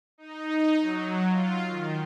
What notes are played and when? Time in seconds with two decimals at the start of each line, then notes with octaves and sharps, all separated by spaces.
0.18 D#4
0.80 F#3
1.28 F4
1.66 D#3